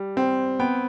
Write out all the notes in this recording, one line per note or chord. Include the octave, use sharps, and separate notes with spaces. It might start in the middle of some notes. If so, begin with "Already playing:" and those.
Already playing: G3
C4
B3 G5